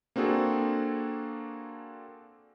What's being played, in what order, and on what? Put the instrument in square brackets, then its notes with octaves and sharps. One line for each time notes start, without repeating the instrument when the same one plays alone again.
[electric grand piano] A#3 C4 D4 F#4 G#4 A4